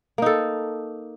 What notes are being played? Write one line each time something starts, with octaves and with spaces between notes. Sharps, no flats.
A#3 D#4 A4